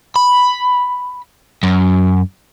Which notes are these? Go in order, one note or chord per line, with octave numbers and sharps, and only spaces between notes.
B5
F#2